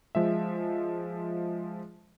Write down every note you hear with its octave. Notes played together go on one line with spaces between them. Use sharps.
F3 G#3 E5